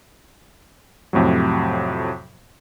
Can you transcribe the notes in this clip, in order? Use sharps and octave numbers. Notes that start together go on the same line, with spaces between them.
F2 A2 C3 F#3